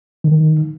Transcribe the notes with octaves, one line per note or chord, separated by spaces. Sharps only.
D#3